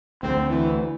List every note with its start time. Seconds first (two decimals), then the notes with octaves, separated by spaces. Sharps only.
0.23 D2 G#3 A3 C4
0.49 E3